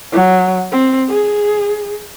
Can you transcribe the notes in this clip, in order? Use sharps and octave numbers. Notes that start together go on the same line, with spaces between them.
F#3
C4
G#4